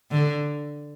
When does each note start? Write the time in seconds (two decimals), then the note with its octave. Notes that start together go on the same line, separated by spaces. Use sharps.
0.11 D3